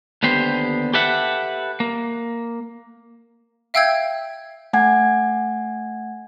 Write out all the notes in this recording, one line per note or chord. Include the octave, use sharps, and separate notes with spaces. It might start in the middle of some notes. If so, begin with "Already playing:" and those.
D#2 D3 B3 G4 C5
G4 A4 B4 E5 F#5
A#3
E5 F5 G5 E6 G6 G#6
A3 F#5 G#5 G#6